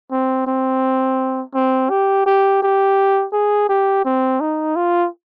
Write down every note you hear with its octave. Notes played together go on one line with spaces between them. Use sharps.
C4
C4
C4
G4
G4
G4
G#4
G4
C4
D#4
F4